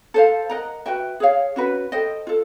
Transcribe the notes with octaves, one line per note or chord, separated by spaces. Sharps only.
A4 C5 F5
A#4 D#5 F#5 A#5
F#4 B4 E5 G5
G#4 C#5 F5
C#4 F#4 B4
A4 C5 D#5 G5
F4 A4